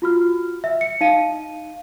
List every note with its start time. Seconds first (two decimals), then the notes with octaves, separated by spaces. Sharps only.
0.02 F4 F#4 F6
0.64 E5
0.81 C#7
1.01 D#4 F5 D#7